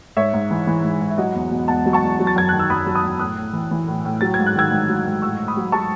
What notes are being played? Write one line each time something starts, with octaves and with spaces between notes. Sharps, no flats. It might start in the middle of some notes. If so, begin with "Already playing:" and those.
G#2 C#5 E5
G#2
E3
E3
G#2
G#2
E5
F#3 D#5 F#5
E2
B2
E2 F#5 A5
F#3
A5 C#6
E2
F#3
A6
F#2 G#6
D#3 F#6
E6
F#2 B5 D#6
F#3
B5 D#6
F#2
A2 D#6 F#6
A2
E3
E3
A2
A2
F#3 A6
G#2 G#6
F#6
D#3 E6 G#6
G#2
F#3
G#2
A2 C#6 E6
A2
B5 D#6
F#3
F#3 A5 C#6